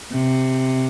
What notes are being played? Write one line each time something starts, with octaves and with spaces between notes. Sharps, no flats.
C3